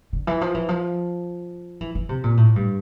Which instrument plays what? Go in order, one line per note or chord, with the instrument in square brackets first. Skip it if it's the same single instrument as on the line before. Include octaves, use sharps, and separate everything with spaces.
[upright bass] D3
E3
F3
E3
F3
E3
E3
C3
A#2
A2
G2